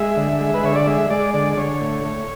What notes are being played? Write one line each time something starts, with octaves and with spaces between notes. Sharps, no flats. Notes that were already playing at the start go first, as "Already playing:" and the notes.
Already playing: G#3 E5
D3
G#3
B4
D3 C#5
D5
G#3 E5
G#3 D5
D3 D5
D5
D3 C#5
A2
A2